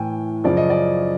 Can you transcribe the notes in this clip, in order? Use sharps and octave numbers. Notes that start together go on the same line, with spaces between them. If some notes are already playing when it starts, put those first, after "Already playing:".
Already playing: A2 E3 G5 G#5
F#2 C#3 F3 D5
D#5
D5